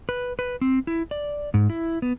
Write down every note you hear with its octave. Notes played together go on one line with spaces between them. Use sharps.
B4
B4
C4
E4
D5
G#2
E4
B3